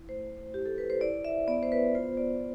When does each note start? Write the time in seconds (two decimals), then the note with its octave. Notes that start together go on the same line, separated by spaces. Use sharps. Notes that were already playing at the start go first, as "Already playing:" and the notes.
Already playing: E4
0.08 A3 C5
0.54 E4 G4
0.66 A4
0.78 B4
0.90 C5
1.01 E4 D5
1.25 E5
1.47 B3 D5
1.63 C5
1.72 B4
1.95 F4 C5
2.17 D5